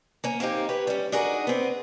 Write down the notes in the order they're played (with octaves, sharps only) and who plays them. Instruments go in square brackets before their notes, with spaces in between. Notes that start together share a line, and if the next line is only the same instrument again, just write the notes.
[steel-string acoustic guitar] A#3 C#4
A#3 C4 D#4 G4
G4 B4 C#5
G3 C#4
D4 D#4 F#4 G#4 A#4
B3 C4